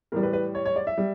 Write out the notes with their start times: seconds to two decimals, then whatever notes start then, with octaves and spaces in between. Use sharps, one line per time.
0.12 A2 E3 G3 A#4
0.23 B4
0.33 B4
0.55 C#5
0.66 C#5
0.76 D5
0.87 E5
0.98 G3